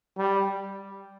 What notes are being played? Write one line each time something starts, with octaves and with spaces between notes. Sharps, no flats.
G3